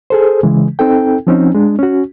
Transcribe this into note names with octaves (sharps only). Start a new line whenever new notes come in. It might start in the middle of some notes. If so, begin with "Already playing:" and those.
G#4 A4 C5
C#3 E3 G#3
C4 D#4 A4 G5
F3 C4 C#4 D#4
G#3 D4
C#4 F#4